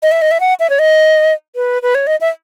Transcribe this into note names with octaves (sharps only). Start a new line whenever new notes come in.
D#5
E5
D#5
E5
F#5
E5
C#5
D#5
B4
B4
C#5
D#5
E5